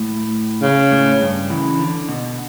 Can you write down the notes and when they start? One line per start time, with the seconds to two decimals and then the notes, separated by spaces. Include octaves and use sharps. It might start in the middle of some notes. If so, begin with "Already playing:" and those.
Already playing: A2
0.62 C#3
0.91 A2
1.21 G2
1.50 C#3 E3
1.78 D3
2.09 B2